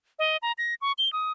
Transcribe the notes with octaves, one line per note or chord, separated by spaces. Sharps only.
D#5
A#5
A#6
C#6
G7
D#6